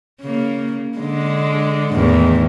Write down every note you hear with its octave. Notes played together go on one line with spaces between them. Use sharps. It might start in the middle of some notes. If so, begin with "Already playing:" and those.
C#3 A#3
D3 G#3
E2 A2 D#3